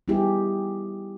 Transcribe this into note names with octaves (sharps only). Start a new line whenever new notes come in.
G3 B3 D#4 E4 G4 G#4